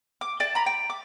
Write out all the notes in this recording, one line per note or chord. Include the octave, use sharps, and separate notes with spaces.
D6
D5 G5 A5
A#5 B5
G5
D6